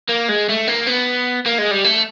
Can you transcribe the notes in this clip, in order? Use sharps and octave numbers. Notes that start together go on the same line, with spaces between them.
A#3
G#3
A3
A#3
B3
A#3
G#3
G3
A3